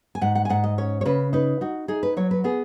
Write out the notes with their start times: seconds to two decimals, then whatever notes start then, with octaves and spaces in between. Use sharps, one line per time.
0.15 G#5
0.21 G#2 F#5
0.35 F#5
0.45 G#5
0.50 G#2 F#5
0.64 D#5
0.78 C#4 C#5
1.01 C#5
1.06 C#3 B4
1.33 D#4 B4
1.61 D#4 F#4
1.88 D#4 G#4
2.03 B4
2.17 F#3 C#5
2.31 B4
2.44 B3 G#4